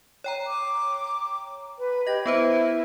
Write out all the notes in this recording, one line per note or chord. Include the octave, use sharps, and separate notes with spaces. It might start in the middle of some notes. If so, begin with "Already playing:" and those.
C#5 G5 A#5
D6
B4
G4 D#5 A#6
B3 E4 B4 C5